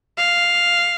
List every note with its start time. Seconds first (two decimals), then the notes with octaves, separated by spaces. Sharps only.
0.18 F5